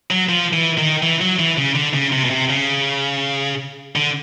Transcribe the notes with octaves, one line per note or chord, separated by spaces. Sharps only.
F#3
F3
E3
D#3
E3
F#3
E3
C#3
D3
C#3
C3
B2
C3
C#3
D3